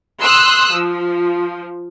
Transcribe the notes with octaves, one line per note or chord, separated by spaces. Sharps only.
C6 D#6 E6 F#6
F3